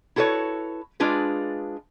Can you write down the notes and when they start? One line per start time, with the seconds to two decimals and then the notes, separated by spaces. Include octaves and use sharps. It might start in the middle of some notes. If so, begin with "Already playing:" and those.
0.16 E4 F#4 A4 B4 C#5
1.00 G#3 D4 F4 G#4 B4